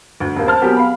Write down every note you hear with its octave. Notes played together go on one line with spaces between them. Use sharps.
D2
D#1 A#3
C5 A5 F6
C3 F#3 B3 G4 G#4 A#4
F5 B5